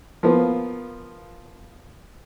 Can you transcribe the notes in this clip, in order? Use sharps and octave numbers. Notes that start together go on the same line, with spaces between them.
F3 A#3 B3